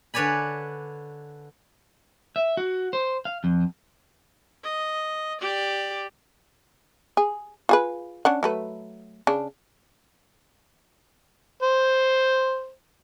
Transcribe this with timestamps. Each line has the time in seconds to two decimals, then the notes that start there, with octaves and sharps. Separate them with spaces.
0.14 D3 B4 C#5 D5 G#5 B5
2.36 E5
2.57 F#4
2.93 C5
3.25 F5
3.44 F2
4.64 D#5
5.41 G4 D5
7.17 G#4
7.69 F4 G#4 B4
8.25 C#4 D4 F#5
8.43 F#3 A3 B4
9.27 C#3 D4
11.63 C5